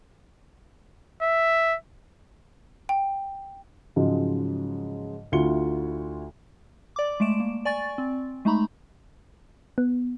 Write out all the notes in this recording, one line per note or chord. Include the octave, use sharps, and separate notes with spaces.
E5
G5
G#2 C#3 F3 F#3 G#3
D2 E4 F4 C#7 G7
D5 D6
G#3 A3 D7 E7
A#3
D5 G#5 C#6 A6
C4
G#3 A3 D#4 A#5 B5 C#6
B3